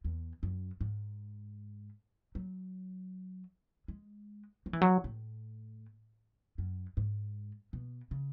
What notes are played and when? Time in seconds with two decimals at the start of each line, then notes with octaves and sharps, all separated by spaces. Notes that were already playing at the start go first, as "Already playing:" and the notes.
0.04 E2
0.43 F#2
0.81 G#2
2.35 F#3
3.88 G#3
4.66 F#3
4.73 E3
4.81 F#3
5.04 A2
6.58 F#2
6.97 G#2
7.73 B2
8.11 C#3